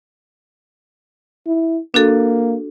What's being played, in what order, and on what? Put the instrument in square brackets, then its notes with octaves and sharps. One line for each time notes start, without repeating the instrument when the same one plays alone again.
[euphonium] E4
[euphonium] A#3 [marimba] D4 F#4 A4